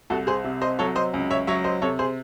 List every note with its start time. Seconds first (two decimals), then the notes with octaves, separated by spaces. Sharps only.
0.10 C2 F#4 A4
0.27 G#4 C5
0.44 C3
0.61 C5 D#5
0.79 F#3 A4 C#5
0.96 C5 D#5
1.14 C#2
1.31 C#5 E5
1.47 F#3 C#5 E5
1.64 C5 D#5
1.81 C3 A4 C#5
1.99 G#4 C5